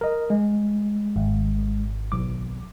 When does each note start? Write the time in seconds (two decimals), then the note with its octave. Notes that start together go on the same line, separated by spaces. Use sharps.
0.01 A#4 D#5
0.30 G#3
1.16 G#1
2.12 B1 D6